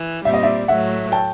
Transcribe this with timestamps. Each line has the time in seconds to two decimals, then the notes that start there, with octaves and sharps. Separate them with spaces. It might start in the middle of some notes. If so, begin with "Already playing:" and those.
Already playing: E3
0.25 A#2 G3 C4 E5
0.34 D#5
0.43 D5 E5
0.68 A2 F#3 A3 E5 F#5
1.12 G5 A5